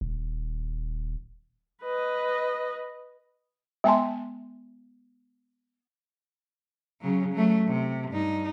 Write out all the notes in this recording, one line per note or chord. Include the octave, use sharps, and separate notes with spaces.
D#1
B4 D#5
G#3 B3 E5 G#5 A5 C6
C#3 F#3
F#3 A3
C3
G2 D#4